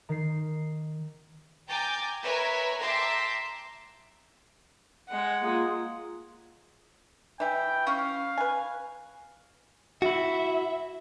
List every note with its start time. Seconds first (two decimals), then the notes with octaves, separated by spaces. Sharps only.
0.09 D#3 C7
1.67 G5 G#5 A#5 D6 G6 A6
2.23 A#4 B4 C#5 E5 G#5
2.80 E5 G5 A5 A#5 C6 D6
5.09 G#3 F#5
5.42 A#3 F4 G#4
7.40 E3 E4 G5
7.87 C#4 F5
8.38 B4 G#5
10.02 E4 F#4 E5